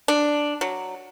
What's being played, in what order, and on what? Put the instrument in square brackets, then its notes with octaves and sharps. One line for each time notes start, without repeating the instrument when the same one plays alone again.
[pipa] D4
F#3